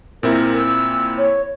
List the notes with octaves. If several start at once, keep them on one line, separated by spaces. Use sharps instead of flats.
A#2 C4 E4 A#4
E6
C#5